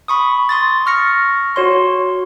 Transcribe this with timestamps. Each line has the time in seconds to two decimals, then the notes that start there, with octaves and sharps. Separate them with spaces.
0.08 B5 C#6 D#6
0.49 C6 D#6 A6
0.86 C#6 F6 A#6 C#7
1.56 F#4 C#5 C6